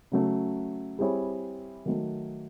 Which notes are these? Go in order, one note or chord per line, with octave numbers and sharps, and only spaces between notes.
C#3 F#3 A3
G3 C4 E4 G#4 C#5
D#3 F#3 A3